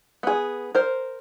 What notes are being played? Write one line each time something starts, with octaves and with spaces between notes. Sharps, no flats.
B3 G#4
A#4 C5